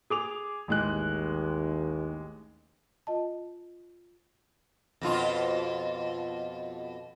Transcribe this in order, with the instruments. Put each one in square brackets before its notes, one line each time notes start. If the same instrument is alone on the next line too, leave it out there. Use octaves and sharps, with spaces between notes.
[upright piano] G#4 D6 F7
[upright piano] A1 G#3 F#6 [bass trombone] D#2
[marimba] F4 D#5 A5
[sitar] F2 B2 F4